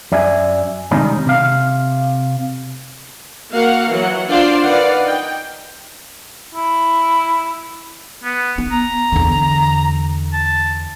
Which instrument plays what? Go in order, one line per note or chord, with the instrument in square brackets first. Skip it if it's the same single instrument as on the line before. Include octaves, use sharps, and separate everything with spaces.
[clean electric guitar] F#2 D5 E5 G#5
C3 D#3 G3 G#3 C#4 D#4
C3 F5
[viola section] A#3 F#4 A#4 F5 F#5
E3 F#3 F#5
D4 F4 C5 D5 F5 C6
D#3 B4 D5 F5 F#5
D#4 G5
[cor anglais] E4
[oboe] B3
[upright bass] B3
[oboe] A#5
[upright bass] E2 D3
[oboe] A5